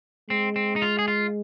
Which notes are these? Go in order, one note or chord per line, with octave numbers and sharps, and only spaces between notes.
G#3 C4
C4
D#4
F4
G#4
F4